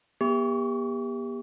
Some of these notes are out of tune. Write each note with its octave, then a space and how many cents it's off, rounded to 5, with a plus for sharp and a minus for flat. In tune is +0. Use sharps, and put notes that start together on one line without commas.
B3 -45 G4 +30 C#6 +45